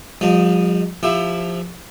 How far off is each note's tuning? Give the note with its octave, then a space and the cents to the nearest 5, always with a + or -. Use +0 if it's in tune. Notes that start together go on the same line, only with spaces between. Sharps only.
F3 +35 G#3 -45 D#4 +0
F3 +0 E4 +0 G4 +30